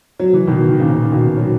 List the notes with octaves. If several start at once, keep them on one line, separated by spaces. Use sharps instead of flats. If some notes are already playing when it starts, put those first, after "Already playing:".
F#3
E3
B2 D#3
D#3
A#2 C#3
B2 D#3
F#3